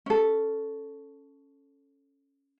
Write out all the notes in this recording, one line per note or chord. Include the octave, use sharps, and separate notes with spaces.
C#4 A4